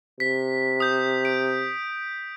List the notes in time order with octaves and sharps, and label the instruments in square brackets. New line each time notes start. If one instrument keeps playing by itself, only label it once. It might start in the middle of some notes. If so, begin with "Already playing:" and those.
[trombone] C3 [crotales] B6
[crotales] D#6 G6
D7